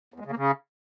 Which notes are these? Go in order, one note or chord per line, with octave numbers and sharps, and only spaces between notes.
E2
G#3
C#3
A#3
C#3